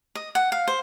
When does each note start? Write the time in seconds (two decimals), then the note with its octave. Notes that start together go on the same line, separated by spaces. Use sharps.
0.15 D#5
0.35 F#5
0.52 F5
0.68 C5